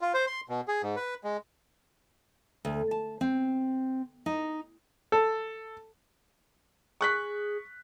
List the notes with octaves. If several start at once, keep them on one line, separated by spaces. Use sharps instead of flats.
F4
C5
C6
B2
G#4
G#2
B4
G#3
D2
A5
C4
D#4
A4
G#4 C#6 F#6 B6